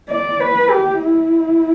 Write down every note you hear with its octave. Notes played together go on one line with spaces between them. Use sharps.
D5
B4
G4
E4